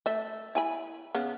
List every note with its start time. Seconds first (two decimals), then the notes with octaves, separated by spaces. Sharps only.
0.06 A3 E5
0.55 E4 G#5 B5
1.15 C#3 B3